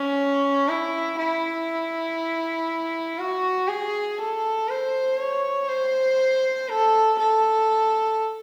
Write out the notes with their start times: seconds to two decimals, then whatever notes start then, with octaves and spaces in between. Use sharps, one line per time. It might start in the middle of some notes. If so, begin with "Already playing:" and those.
Already playing: C#4
0.68 E4
1.18 E4
3.18 F#4
3.68 G#4
4.18 A4
4.69 C5
5.19 C#5
5.68 C5
6.69 A4
7.19 A4